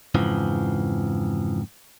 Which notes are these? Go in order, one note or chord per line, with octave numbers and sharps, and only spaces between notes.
F2 G#2 C#3 E3 F3